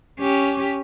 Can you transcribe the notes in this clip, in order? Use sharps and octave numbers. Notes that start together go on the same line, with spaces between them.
C#4 G4